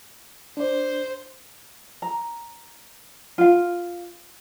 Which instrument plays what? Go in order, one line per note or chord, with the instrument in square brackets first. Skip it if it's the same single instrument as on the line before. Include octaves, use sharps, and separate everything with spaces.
[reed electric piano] D4 D5 [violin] C5
[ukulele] A#5
F4 F5